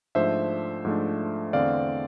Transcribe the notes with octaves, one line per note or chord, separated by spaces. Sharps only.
G#2 F3 A3 D4 C5 E5
G#2 F3 A3 D4
E2 D3 A3 C4 D5 F5